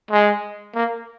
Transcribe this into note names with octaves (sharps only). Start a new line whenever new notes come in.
G#3
A#3